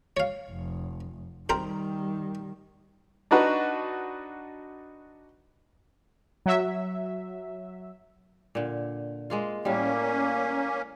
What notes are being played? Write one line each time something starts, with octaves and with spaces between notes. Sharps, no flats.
C#5 F5
F1
D#3 G3 C4 A#4 C5
D4 D#4 F#4 B4
F#3 E5
A#2 D3
G#3 A#3 F4
A2 G3 A#3 C#4